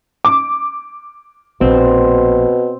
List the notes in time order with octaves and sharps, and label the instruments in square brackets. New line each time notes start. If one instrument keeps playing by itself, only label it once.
[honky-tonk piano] D6
[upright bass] A#1 [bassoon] B2 [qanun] C4